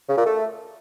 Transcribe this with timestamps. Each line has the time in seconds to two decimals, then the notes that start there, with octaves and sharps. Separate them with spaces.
0.08 C#3
0.17 A#2
0.26 A3